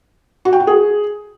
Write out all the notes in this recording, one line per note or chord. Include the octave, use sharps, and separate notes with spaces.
F#4
G5
F#4
G#4